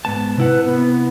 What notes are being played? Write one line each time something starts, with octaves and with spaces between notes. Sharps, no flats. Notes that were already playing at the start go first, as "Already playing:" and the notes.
G#2 B3 A5
C3 E4 B4 F#5
B3